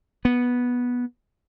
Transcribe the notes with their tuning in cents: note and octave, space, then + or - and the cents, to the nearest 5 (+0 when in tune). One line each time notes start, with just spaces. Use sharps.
B3 -10